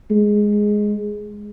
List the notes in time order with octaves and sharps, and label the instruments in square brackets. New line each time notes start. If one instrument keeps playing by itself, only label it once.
[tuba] G#3